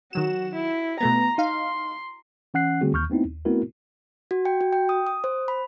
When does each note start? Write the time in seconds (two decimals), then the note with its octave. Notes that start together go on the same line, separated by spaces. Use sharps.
0.13 D#3 F#3 F#4 E7
0.55 E4
1.00 B2 A3 B3 A#5
1.38 D#4 F5 C6
2.54 E3 C#4 F#5 F#6 C7
2.81 D3 G3 A3 C4 F#4 G#4
2.93 D#2 C#6 F6 G6
3.10 A3 B3 C4 D#4 E4
3.25 D#2
3.45 A3 B3 C4 E4 F#4 A#4
4.31 F#4
4.45 G5
4.61 F#4
4.73 G5
4.89 D#6
5.07 D#6
5.24 C5
5.48 B5